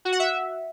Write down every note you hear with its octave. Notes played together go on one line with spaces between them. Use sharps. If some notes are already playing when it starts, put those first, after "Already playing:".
F#4
F#5
E5